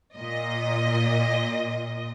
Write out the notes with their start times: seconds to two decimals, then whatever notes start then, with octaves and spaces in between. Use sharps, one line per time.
0.16 A#2 D#5